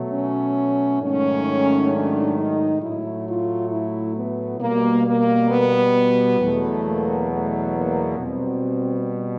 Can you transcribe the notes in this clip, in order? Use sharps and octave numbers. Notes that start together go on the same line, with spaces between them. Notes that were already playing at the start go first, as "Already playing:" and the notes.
Already playing: B2 F#3 A3
C#4
G#2 D#3 F#3 A3 C#4
D4
D#4
A2 F#3 A3 E4
F4
E4
B3
B2 G3 A#3
A#3
B3
E2 B2 F#3 A3
A#3
A3
A#3
B2 G3 C4